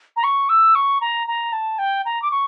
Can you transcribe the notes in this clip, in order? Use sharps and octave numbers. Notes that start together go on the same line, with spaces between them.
A#5
C#6
E6
C#6
A#5
A#5
A5
G5
A#5
D6
C#6